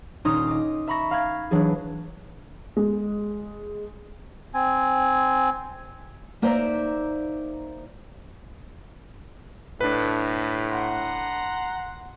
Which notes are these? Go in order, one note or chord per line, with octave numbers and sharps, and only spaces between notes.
D#1 C#4 D#4 C6 D#6
D#5 D6
E5 A#5 B5 C#6 A#6
F5 B5 G#6
E3 F#3 D4 G#4
G#3
C4 G#5
A#3 D#4 C5 D5 E5 A#5
A2 D4 B4
F#5 A#5 C6